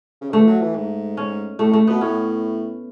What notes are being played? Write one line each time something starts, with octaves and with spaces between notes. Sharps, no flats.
C#3
D3 A3
E3
F#3
E3
G#2
C#4
A2 A3
A3
B2 B3
A2 C#4